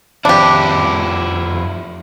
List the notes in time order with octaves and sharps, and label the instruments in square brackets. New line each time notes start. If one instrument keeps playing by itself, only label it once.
[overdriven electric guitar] F2 E4 [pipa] D4 G4